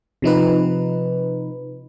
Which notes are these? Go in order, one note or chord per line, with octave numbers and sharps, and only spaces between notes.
C3 F3 D#4 B4